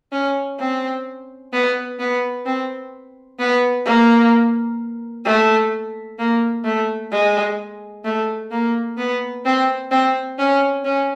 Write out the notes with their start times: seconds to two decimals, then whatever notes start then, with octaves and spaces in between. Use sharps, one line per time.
0.12 C#4
0.60 C4
1.53 B3
1.99 B3
2.46 C4
3.39 B3
3.86 A#3
5.25 A3
6.19 A#3
6.65 A3
7.12 G#3
8.04 A3
8.51 A#3
8.98 B3
9.45 C4
9.91 C4
10.39 C#4
10.85 C#4